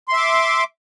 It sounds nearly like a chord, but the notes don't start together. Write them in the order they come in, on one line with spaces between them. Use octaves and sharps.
C6 E5 D6